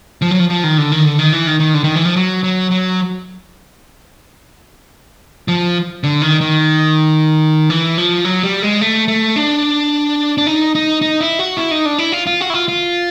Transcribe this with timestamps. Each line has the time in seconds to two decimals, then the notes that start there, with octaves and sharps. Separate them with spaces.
0.22 F3
0.31 F#3
0.39 F3
0.50 F3
0.64 D#3
0.78 D3
0.92 D#3
1.05 D3
1.19 D#3
1.33 E3
1.47 D#3
1.60 D#3
1.74 D3
1.84 D#3
1.95 E3
2.05 F3
2.16 F#3
2.44 F#3
2.71 F#3
5.48 F3
6.04 D3
6.22 D#3
6.41 D#3
7.70 E3
7.98 F3
8.25 F#3
8.44 G3
8.62 G#3
8.81 A3
9.08 A3
9.36 D4
10.38 D4
10.47 D#4
10.75 D#4
11.01 D#4
11.21 E4
11.39 F#4
11.57 E4
11.71 D#4
11.85 D4
11.99 E4
12.12 F4
12.27 F4
12.41 F#4
12.50 E4
12.54 F4
12.68 F4